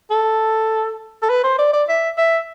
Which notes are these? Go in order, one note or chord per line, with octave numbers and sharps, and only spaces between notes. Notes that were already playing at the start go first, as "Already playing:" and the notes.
A4
A4
B4
C5
D5
D5
E5
E5